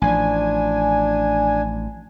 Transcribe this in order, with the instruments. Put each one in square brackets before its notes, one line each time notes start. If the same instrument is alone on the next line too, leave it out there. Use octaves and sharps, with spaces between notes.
[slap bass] A1 F3 [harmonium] D4 [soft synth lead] G#5